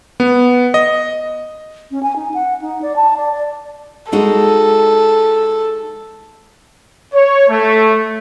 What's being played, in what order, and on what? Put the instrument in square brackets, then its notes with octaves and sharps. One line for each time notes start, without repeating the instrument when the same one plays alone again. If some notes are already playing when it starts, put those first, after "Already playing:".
[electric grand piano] B3
D#5
[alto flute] C#4
G#5
D#4
F#5
D#4
D5
A5
D5
D5
[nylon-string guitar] G#3 D#4 F#4 [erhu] A4
[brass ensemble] C#5
A3